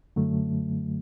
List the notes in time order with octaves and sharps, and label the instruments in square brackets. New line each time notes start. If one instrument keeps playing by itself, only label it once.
[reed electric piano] F#2 D3 F#3 A3